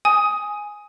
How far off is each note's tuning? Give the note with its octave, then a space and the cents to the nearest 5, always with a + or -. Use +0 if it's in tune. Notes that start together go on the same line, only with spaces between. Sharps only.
G#5 +0 D#6 +10